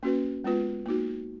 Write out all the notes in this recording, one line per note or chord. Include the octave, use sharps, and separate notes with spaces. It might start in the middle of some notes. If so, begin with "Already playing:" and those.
A#3 C#4 F#4 B4
G#3 B3 F4 B4
A#3 D#4 F#4